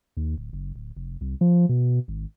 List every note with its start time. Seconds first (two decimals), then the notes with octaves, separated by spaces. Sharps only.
0.17 D#2
0.37 D1
0.53 F#1
0.75 D1
0.96 F1
1.21 C2
1.41 F3
1.69 B2
2.08 G#1